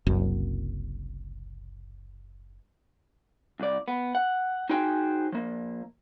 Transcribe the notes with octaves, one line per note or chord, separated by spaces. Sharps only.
F#1 C2 F#2
C2 D5
B3
F#5
D#4 F#4 G#4 C5 G5 G#5
F3 A#3